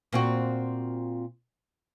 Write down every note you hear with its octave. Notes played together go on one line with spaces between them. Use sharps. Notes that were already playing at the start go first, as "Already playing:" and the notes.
A#2 C4 F#4